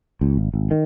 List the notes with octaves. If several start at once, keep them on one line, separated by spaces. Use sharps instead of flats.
C#2
G#1
G#1
D#3